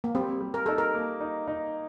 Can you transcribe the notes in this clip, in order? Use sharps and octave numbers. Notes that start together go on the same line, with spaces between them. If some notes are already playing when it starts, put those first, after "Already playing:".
A#3
G3 C4
G3
A#4
D#4 A4
A#4
A#3
D#4
D#4